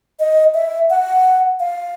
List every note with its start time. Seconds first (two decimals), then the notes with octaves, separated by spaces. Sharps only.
0.20 D#5
0.54 E5
0.90 F#5
1.60 F5